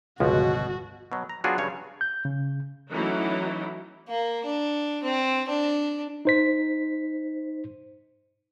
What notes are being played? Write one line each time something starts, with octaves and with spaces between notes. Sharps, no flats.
G1 C#2 B2 F3 F#4
B2 F#3
A#5
F#3 B3 D4 F4 F#4 G#4
G2 C#3 C#5
G6
C#3
E3 F#3 A3 C#4 D#4 E4
A#3
D4
C4
D4
D#4 C5 B6